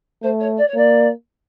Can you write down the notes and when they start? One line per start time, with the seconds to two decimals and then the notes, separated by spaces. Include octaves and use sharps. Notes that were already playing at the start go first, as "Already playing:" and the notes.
0.23 A3 C5
0.40 C#5
0.57 D5
0.67 C#5
0.75 A#3 D5